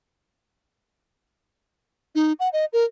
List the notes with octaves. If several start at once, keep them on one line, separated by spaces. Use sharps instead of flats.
D#4
F#5
D#5
A#4